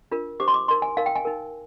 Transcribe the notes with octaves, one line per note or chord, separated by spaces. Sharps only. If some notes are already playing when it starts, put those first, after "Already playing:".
D4 F4 A#4
D4 G4 C5 D6
C6
D6
D#4 A#4 C6
G#5
D#4 A#4 F5
G5
G#5
D#4 A#4